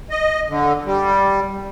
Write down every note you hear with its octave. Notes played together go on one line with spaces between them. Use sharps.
D#5
D3
G3